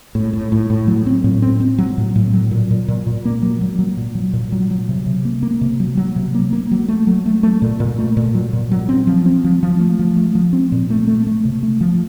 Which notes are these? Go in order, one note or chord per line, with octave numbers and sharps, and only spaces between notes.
A2
A2
A2
A2
F#3
C4
A2
C4
C4
F#3
A2
A2
F#3
A#2
A#2
A#2
A#2
A#3
F#3
F#3
F#3
A#2
F#3
A#2
F#3
F#3
C3
C3
A#3
A#3
C3
F#3
F#3
C3
A#3
A#3
F#3
A3
F#3
A3
A3
A#2
A#2
A3
A#2
F#3
A#2
F#3
C4
F3
C4
F3
F3
A3
F3
A3
F3
C4
A#2
A3
A3
A3
C3
A3
F3